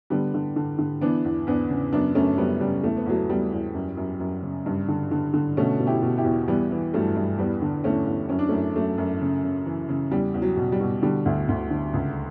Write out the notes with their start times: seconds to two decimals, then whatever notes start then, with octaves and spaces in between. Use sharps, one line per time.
0.10 D3 G3 B3
0.34 D3
0.56 D3
0.78 D3
1.01 E3 B3 D4
1.25 E2
1.47 E2 B3 D4
1.70 C#3
1.92 F#2 B3 D4
2.15 F#2 A3 C#4
2.38 F#2 G3 B3
2.60 C#3 G3
2.83 E2 A3
2.97 B3
3.06 E2 F#3 A3
3.29 E2 G3 B3
3.52 E2
3.74 F#2
3.97 F#2
4.20 F#2
4.43 C#3
4.66 G2
4.88 D3
5.11 D3
5.34 D3
5.57 B2 A3 C#4
5.80 B2
5.86 E4 G4
6.02 B2
6.17 E4 G4
6.24 E2
6.48 E3 G3 B3
6.71 E3
6.93 G2 F#3 A3
7.16 G2
7.38 E2 G3 B3
7.62 D3
7.84 E2 A3 C#4
8.07 E2
8.29 F#2 C#4
8.39 D4
8.49 F#2 A3 C#4
8.75 F#2 F#3 A3
8.98 F#2
9.21 C#3
9.44 C#3
9.66 E3
9.89 C#3
10.11 E2 G3
10.34 E2
10.42 F#3
10.57 B2
10.72 G3
10.81 B2
11.02 D3 G3
11.26 D2
11.48 D2
11.70 D3
11.93 C#2